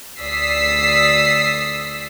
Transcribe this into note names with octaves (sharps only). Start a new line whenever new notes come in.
D2 D5 D#6 E6 B6 C7